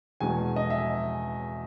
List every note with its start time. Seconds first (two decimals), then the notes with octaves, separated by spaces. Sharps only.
0.20 E2 B2 G#3 G#5
0.56 D#5
0.70 E5